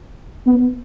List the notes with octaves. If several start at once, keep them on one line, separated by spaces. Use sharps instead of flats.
B3